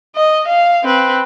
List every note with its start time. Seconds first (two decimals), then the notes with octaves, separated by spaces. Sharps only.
0.16 D#5
0.48 F5
0.83 C4 B4